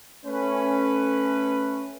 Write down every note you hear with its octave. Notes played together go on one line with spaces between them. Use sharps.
A3 C#4 B4